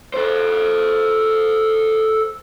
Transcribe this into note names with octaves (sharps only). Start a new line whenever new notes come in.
A4 C5